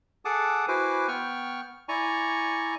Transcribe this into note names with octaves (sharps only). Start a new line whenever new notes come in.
G#4 A4 F#5 A5 D6 D#6
E4 F#4 B4 C5 G#5 D6
B3 G5 C#6 F6
E4 D5 G#5 A#5 C#6